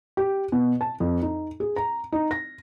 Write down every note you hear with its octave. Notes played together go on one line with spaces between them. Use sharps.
G4
B2
A5
F2
D#4
G#4
A#5
D#4
A#6